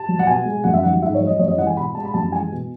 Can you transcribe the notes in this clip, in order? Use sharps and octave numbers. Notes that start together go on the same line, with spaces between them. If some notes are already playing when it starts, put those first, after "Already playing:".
Already playing: A5
F#3
F#5
B2 G#5
G#3
F#2 F#5
E5
D#3 F#3 F#5
G#2 E5
C#5
F#3
D#5
F#2 C#5
D#5
E3 G#3 F#5
G#5
B2 B5
G#3 A5
B5
F#2 A5
E3 G#3 G#5
B2